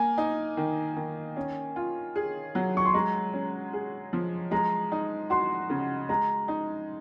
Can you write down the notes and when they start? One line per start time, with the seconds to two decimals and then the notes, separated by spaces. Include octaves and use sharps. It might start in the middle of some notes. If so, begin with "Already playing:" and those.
Already playing: A#3 G#5
0.18 D#4
0.57 D#3
0.96 D#3
1.36 C#4
1.76 F4
2.16 G#4
2.55 F#3
2.77 C#6
2.86 C6
2.94 G#3 A#5
3.33 C#4
3.73 G#4
4.13 F3
4.51 G#3 A#5
4.92 D#4
5.30 F#4 C6
5.70 C#3
6.09 G#3 A#5
6.48 D#4